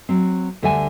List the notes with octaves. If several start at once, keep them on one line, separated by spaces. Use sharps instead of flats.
F#3 C4
D2 D3 G3 E5 F#5 G#5